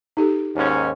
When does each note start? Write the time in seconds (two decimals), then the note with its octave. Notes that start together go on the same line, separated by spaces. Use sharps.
0.17 D#4 G4 A4
0.56 D#2 G#2 C#4